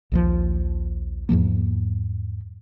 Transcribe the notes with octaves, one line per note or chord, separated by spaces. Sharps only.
A#1 D#2 F3
E2 G#2 F3 A#3